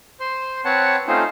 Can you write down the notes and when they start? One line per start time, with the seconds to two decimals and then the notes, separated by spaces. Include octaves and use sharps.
0.20 C5 C6
0.65 C4 B4 C#5 F#5 A5
1.08 A3 C4 C#4 D#4 F4 C5